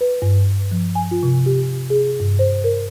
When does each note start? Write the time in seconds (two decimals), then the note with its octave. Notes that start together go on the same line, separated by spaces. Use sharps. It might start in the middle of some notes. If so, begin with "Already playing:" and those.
0.01 B4
0.22 G2
0.72 F3
0.95 G#5
1.11 F4
1.23 C3
1.46 G4
1.90 G#4
2.20 G2
2.39 C5
2.64 A#4